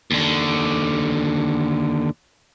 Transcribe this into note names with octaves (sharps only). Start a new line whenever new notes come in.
D#2 D3